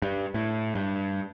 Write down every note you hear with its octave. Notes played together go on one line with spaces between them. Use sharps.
G2
A2
G2